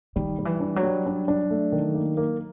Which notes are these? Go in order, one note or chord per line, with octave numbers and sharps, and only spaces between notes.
D#3 G3
G3
E3
D4
F#3
G3
D4
D4
A3
D#3
A#3
A#3